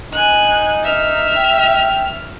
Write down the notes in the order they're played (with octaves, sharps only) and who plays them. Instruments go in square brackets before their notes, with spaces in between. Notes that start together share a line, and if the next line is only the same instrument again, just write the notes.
[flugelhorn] D#4 [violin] G#5 F#6
[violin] E5 F6
[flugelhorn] G5